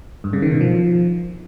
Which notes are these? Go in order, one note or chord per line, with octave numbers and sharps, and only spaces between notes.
G2
C#3
D#3
B2
F3